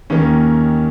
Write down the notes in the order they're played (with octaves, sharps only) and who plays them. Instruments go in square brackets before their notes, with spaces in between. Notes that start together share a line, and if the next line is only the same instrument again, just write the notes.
[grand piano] D#2 D#3 A#3 C#4